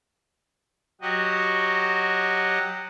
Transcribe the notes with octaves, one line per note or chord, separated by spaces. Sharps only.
F#3 F#4 G4 D#5